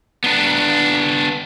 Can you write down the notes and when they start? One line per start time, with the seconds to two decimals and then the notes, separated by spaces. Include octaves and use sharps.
0.24 B3 D4